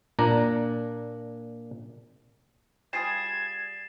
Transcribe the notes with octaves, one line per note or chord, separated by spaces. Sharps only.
A#2 D4 A#5
G3 F4 G#4 G#6 A6 C7 E7